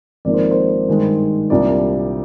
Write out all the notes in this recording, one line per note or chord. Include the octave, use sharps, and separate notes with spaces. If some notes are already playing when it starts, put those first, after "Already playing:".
G#1 G#2 F3 A#3 D5
C5
C5
G2 D#3 G#3
C2 A#2 G3 D4 D5